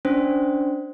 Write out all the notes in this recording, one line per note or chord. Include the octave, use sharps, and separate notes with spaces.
C#4 D4 C5